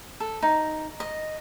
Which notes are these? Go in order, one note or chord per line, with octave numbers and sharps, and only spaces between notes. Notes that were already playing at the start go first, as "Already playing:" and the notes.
A4
D#4
D#5